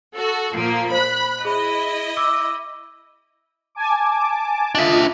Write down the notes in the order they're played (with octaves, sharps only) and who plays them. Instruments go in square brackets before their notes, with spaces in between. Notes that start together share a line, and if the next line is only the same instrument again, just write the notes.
[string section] F#4 A4
[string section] A#2 F3 A#3 [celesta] C7 D7
[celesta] C5 [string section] B5 F#6
[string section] E4 D#5 [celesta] G#4 B5
[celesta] D6 E6
[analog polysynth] G#5 A5 D6
[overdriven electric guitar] D4 E5 [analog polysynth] F4 D#5